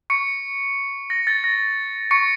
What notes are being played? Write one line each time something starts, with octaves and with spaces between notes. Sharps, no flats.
C#6 C#7
A#6
A6
A#6
C#6 C#7